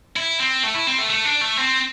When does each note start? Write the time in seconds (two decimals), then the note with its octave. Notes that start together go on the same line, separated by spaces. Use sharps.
0.16 E4
0.40 C4
0.63 A3
0.74 E4
0.87 C4
0.99 A3
1.10 A3
1.25 D4
1.41 A3
1.57 C4